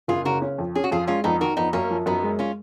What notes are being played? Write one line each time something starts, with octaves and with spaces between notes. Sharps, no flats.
F#1 F4 G#4
C#3 F#4 A#4
C#4
F2
C#4 G#4
F#4
F2 F4 G#4
G#3 C#4 F4
F2 B3 D#4
D#3 F#4 A#4
F2 B3 D#4
F#2 A#3 C#4
F3
F#2 B3 D#4
G#3
C#4 F4